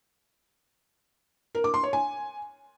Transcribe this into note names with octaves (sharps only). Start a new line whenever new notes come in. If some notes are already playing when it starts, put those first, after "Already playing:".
A#4
D6
C6
C#5
G#5